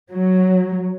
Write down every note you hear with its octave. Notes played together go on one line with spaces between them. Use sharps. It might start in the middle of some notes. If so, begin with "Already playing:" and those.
F#3